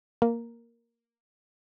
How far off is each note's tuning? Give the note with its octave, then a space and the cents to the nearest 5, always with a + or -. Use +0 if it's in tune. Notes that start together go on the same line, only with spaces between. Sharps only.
A#3 +0 A#4 +0